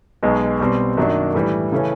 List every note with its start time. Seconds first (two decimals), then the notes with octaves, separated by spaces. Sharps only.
0.23 B1 B2 G#3
0.60 B2 G3 C4
0.97 F#2 D#3 F#3 A#3 D4
1.35 A2 E3 G3
1.72 C#3 E3 A3 C#4